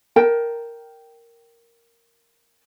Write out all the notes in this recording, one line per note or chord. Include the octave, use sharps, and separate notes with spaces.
A#4 G5 A5